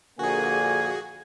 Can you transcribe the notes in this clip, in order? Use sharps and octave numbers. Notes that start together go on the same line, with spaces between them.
A#1 D3 A#3 F#4 G#4 G#5